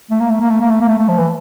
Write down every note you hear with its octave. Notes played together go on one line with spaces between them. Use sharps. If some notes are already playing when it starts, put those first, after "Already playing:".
A3
A#3
A3
A#3
A3
A#3
A3
A#3
A3
A3
F3
E3